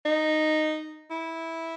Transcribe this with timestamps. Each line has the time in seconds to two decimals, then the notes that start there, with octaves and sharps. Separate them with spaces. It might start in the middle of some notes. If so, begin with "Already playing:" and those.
0.05 D#4
1.11 E4